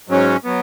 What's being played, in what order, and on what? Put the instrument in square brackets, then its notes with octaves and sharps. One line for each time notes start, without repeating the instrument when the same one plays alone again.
[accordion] G#2 F#3 C#4
F#3 B3